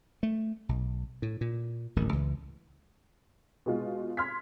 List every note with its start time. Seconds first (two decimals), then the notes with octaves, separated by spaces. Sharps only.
0.23 A3
0.69 B1
1.22 A2
1.41 A#2
1.96 D1 A1 G#2 D#3
2.13 C#2 E3
3.66 B2 G#3 F4
4.17 C6 F6 G#6 B6